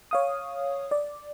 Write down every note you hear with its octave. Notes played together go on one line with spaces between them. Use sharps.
C#5 F5 D#6
D5